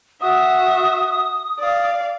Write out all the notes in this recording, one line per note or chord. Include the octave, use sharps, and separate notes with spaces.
F#4 E5 D#6
D5 F5